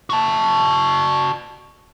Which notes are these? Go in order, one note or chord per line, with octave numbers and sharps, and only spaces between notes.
F#4 A5